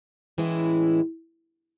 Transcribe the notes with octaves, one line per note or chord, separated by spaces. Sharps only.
A2 E3 G#3 C#4 E4